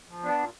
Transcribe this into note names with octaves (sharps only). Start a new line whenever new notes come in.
F3
B3 D4
A#2